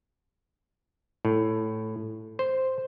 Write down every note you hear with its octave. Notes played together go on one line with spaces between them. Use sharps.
A2
C5